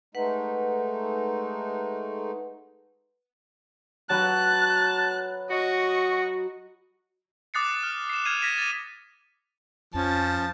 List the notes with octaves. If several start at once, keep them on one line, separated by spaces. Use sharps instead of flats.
G#3 A3 D#4 B4 F#5
F#3 B4 A5 F#6
F#4 D#5 C#6
D6 D#6 F#6 A6 C7 C#7
F6
C7 E7
F6 F#6 G#6 C7 D#7 F7
G#6 A#6 B6 D#7 E7
A6 D#7
F2 F3 C#4 A5